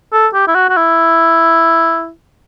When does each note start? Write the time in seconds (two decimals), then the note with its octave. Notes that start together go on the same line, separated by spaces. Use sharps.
0.13 A4
0.34 G4
0.48 E4
0.55 F#4
0.69 F#4
0.77 E4